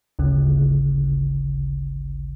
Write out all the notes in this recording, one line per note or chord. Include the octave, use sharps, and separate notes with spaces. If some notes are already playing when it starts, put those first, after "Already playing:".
G#1 D2 C#3